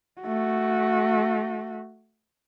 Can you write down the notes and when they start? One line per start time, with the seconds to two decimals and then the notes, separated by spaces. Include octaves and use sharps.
0.22 A3 F#4